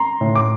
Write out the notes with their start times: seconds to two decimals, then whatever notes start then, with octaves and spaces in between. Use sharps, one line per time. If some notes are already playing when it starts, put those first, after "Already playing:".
Already playing: A#5 C6
0.21 A2
0.35 D6